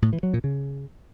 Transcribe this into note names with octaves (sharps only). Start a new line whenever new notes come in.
A2
E3
F#3
A#2
C#3